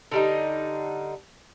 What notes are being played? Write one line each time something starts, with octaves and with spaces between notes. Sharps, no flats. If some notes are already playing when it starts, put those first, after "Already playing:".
D3 G3 D#4